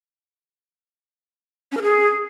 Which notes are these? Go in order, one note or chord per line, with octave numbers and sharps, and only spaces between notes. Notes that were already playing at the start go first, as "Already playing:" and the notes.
C#4
A#4
G#4